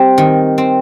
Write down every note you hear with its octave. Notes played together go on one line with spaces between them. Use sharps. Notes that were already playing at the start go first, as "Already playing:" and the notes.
Already playing: G3 C4
D#3
C4